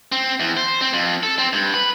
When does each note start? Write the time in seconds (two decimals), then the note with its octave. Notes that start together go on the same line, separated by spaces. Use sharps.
0.12 C4
0.40 E2
0.57 C5
0.81 C4
0.93 F2
1.23 A4
1.38 C4
1.53 G2
1.74 B4